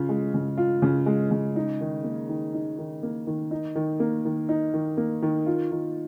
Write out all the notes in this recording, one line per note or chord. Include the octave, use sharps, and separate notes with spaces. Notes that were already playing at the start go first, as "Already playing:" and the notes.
Already playing: C#3 F4
G#3
C#3
F4
C#3
G#3
C#3
D#4
D#3
A#3
D#3
D#4
D#3
A#3
D#3
D#4
D#3
A#3
D#3
D#4
D#3
A#3
D#3
F4
D#3